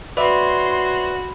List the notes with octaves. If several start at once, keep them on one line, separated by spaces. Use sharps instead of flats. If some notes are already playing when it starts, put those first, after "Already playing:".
F#4 B4 C#5 D5 E5 B5 C6